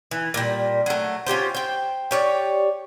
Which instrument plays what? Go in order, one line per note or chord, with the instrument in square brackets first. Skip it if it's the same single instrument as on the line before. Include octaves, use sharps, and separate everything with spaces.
[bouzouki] E3
A#2 G3
F#3 A3
C#4 F4 G4 C5
C5 G5
G4 C#5 D5